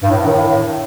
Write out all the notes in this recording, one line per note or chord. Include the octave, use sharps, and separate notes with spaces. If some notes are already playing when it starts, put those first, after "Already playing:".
G2
A2
G2
D#3
A2